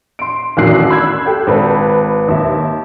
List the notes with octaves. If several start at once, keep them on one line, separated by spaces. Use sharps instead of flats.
C6 D7
A1 E2 D#3 F#4 F#6 C7
B5 E6 F#6 G#6
G4 A4
G#1 B4 A5
D#2 E5